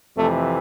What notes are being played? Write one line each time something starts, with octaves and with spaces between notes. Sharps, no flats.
F2 C3 E3 A3